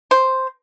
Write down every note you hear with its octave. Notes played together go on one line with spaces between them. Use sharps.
C5